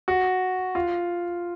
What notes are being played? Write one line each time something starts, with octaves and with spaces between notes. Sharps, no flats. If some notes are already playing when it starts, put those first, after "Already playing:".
F#4
F4